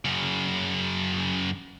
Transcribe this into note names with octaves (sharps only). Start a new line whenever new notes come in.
F#2 C#3